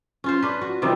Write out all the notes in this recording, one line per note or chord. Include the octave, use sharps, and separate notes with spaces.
C#4 F4 C5
D4 B4
F#4
C3 D#3 F3 G3